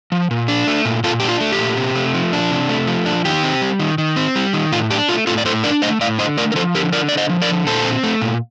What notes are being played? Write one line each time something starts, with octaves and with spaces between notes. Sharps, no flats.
F3
A#2
D4
A3
A#2
A#2 F4 A4
D4 G4
F4
A3
G4
A#2
C3
A3
F3
D4
C3
A3
F3
D4
D#3 G4
C4
G3
D#3
D#3
C4
G3
D#3
A2 F4
D4 G4
A3 F4
A2 F4 A4
D5
A2 A4 C5
D4 A#4 D5
A3 C5 D#5
A2 D5 F5
D3 C5 D#5
A3 A#4 D5
A#4
F3 A4 C5
D3 G4 A#4
D3 A#4 D5
A3 D5
C5 D#5
F3
A#4 D5
D3
A#2 A4 C5
C4
A3
A#2